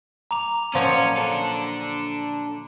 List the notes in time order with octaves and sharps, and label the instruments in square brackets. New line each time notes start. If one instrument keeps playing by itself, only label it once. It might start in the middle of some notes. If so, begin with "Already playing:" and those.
[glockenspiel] A#5 D6 F7
[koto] A#2 F3 F#3 [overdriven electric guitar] C#4
[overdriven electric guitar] D4 A4